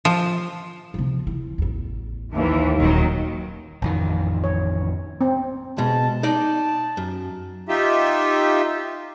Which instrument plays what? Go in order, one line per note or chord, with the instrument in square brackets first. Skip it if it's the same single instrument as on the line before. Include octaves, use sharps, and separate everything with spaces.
[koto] F3
[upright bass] C3 F3
E3
A1 E2
[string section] D#2 E3
[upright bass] D#1 A#1 [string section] D#3 F#3
[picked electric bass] A1 F2 D#3
[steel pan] C#5
C4
[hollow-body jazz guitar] B2 G#3 [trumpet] A5
[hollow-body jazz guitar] D#4 D5 [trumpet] A5
[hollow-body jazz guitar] F#2
[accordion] D#4 F4 G4 E5